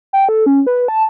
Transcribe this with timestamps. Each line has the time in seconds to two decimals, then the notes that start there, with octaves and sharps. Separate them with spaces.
0.13 G5
0.29 A4
0.46 C#4
0.67 B4
0.88 A5